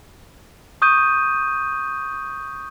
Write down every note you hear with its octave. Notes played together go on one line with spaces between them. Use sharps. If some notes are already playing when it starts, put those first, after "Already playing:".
C#6 D#6 G6 D#7